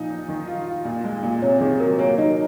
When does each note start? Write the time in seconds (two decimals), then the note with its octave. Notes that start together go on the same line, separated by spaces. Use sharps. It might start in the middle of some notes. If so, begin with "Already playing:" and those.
Already playing: A#2 F3 D#4
0.10 D#4
0.29 D#3
0.47 F4
0.67 F4
0.85 A#2
1.04 G#3
1.23 A#2
1.42 C3 C#5
1.60 D#3 G#4
1.80 F#3 A#4
1.99 A#3 C#5
2.17 F#3 D#4 D#5